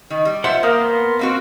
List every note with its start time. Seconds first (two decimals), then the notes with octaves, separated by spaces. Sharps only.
0.10 D#3
0.25 G3
0.44 F4 C5 E5 F#5
0.63 A#3 A#4 F5 D#6 G6
0.81 B3 C6
1.19 A#3 C4 F#4 F5